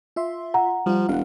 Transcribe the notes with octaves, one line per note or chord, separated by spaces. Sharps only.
F4 E5 C6
F#5 A#5
F3 G3 F4
E1 F5 F#5